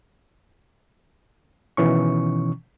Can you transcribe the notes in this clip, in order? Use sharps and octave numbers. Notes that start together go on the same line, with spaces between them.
B2 D#3 E3 C#4 C#6